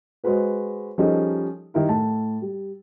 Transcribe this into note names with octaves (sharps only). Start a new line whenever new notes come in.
G#3 F#4 G#4 B4 C5
F3 G3 C#4 D#4 G#4 A4
D#3 G3 E4 A#4
A2 A5
G3